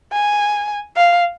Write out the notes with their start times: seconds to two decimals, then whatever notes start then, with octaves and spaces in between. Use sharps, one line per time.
0.13 G#5
0.97 F5